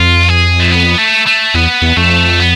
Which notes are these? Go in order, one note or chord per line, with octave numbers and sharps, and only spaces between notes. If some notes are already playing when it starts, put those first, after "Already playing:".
Already playing: F2 F4
G#4
A3
B3
A3
A3
E2 B3
E2
F2 A3
B3